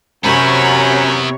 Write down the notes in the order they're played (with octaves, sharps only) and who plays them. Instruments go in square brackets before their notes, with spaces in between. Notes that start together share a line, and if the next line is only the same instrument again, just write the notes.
[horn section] F#2 [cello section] C3 C#5 [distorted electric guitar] B3 E4 [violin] A#4 B5